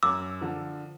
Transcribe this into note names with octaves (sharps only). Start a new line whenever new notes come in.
F#2 D6 E6
D3 F3